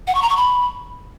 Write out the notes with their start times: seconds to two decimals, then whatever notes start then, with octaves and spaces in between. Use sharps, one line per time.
0.07 F#5
0.15 C#6
0.22 A#5
0.30 C#6
0.37 B5